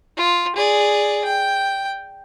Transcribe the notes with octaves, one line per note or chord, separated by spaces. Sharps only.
F4
G#4 D5
G5